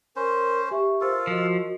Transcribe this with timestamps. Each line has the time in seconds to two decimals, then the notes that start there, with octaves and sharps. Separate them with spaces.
0.16 C#4 A#4 C5
0.71 G4 E5 C#6
1.01 F4 A4 A#4 C5
1.27 F3 F#4 A#4 D#5